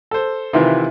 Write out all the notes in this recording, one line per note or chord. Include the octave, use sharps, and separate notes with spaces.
A4 C5
C3 D#3 E3 E4 F4 B4